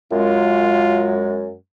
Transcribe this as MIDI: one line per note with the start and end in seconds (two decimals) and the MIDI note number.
0.12 1.53 42
0.12 1.53 56
0.12 1.35 65